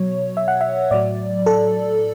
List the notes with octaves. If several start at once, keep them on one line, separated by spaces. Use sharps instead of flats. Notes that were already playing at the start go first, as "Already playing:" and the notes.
Already playing: B2 F#3 C#5
E5
F#5
E5
A2 F#3 D5
A4